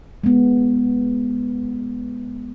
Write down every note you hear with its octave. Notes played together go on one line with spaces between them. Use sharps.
G#3 B3